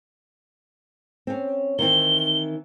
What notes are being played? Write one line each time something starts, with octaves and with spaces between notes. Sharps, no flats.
C4 C#4
D#3 E3 C4 G7